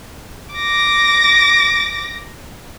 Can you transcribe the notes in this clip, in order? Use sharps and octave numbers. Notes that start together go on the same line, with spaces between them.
D6 A#6